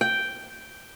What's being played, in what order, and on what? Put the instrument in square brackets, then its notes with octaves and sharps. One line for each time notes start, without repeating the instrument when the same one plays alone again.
[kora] G5